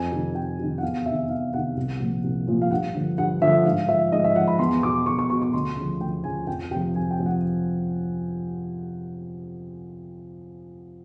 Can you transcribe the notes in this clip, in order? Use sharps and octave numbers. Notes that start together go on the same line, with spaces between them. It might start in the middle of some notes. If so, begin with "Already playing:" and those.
Already playing: F2 G#5
C3 D#3
F2 G5
C3 D#3
F#5
E2 F5
C3 D#3 E5
E2 F5
C3 D#3 F#5
C2
A#2 F3
C2
A#2 F3
F5
G2 F#5
D3 F3
G2 F#5
D3 F3 E5
G#2 F5
F3 E5
G#2 D#5
E5
F3 F#5
B5
E2 C6
B2 D6
E2 C#6
C#6
B2 C#6
C#6
D2 C6
C#3 F3
D2 G5
C#3 F3 G#5
F2 G5
C3 F3 G5
F2 G#5
G5
C3 F3
F#5